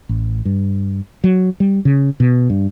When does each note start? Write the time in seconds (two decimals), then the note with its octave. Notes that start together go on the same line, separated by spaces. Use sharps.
0.09 A1
0.45 G2
1.24 F#3
1.60 G3
1.85 C#3
2.20 B2
2.50 G2